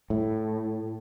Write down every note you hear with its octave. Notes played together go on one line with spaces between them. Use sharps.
A2